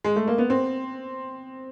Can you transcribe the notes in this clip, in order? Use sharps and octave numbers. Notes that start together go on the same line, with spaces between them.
G#3
A3
A#3
B3
C4